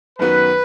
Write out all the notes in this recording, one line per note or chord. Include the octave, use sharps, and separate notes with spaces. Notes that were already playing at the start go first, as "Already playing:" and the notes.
F#2 D#3 B3 F#4 B4